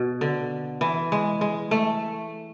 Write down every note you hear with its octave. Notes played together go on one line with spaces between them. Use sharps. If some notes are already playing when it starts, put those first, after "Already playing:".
Already playing: B2
D3
E3
G#3
G#3
A3